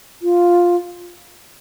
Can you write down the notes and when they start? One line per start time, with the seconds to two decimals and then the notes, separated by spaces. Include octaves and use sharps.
0.22 F4